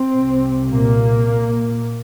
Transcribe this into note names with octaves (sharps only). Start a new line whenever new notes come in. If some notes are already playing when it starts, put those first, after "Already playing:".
Already playing: C4
C2 C3
A#2 A#3